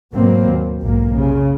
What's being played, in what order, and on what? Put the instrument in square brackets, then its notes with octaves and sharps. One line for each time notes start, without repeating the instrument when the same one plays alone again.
[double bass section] G#2 B2 F#3 A#3 C4
D#2
B1 F2 G#2 A#3
C#3